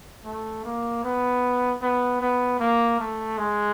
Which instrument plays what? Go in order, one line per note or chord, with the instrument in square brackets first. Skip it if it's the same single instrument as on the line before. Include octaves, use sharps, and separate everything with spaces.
[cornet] A3
A#3
B3
B3
B3
A#3
A3
G#3